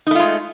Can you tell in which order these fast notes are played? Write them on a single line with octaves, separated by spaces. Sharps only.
D#4 A3 F4 G#3